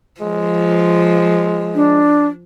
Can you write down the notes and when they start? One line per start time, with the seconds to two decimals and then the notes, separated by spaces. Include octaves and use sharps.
0.21 F3 G#3
1.75 D4